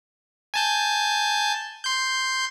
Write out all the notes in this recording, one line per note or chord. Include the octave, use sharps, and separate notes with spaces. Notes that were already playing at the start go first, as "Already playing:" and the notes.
G#5 A5 G6
C6 G6